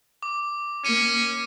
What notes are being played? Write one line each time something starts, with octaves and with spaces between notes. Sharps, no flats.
D6
A#3 C#4 C#7 D#7